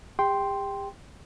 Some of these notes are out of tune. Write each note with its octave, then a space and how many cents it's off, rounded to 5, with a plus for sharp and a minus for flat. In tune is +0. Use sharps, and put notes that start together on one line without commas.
G4 +40 G5 +0 C6 +0